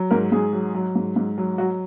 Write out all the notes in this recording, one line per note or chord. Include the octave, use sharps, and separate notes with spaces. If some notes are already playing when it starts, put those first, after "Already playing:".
Already playing: F#3
G#2 A#4
G#2 G#4
F#3
F#3
G#2
G#2
F#3
F#3 F#4